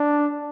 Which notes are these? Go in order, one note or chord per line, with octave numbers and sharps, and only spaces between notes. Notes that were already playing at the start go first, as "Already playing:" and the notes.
Already playing: D4